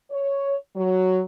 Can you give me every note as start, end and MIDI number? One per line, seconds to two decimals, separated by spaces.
0.11 0.56 73
0.76 1.22 54